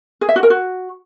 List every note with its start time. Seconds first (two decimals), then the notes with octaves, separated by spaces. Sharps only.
0.21 G#4
0.29 E5
0.36 F#4
0.43 A#4
0.50 F#4